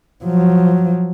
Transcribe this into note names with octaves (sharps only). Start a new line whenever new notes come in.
F3 F#3